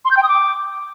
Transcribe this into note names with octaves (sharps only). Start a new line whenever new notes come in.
C6
G6
G5
D#6
D6